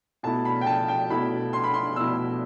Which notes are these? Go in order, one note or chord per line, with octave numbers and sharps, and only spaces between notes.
B2 A3 E4 A5
B5
G5
A5
G5
B2 A3 E4 B5
C6
B5
C6
B2 A3 E4 E6